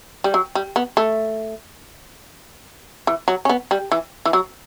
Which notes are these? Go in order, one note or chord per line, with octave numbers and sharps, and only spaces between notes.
G3
F#3
G3
B3
A3
E3
F#3
C#4
B3
G3
E3
E3
F#3